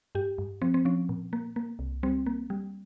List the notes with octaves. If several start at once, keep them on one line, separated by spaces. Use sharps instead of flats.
G2 G4
G2
F3 C4
C4
F3 C#4
A#2
A#3
A#3
C2
G3 C4
A#3
G3